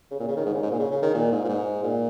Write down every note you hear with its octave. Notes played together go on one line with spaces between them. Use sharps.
C#3
A#2
C#3
D#3
G#2
C#3
G#2
A#2
C#3
C#3
D#3
A#2
G#2
A#2
G#2
A#2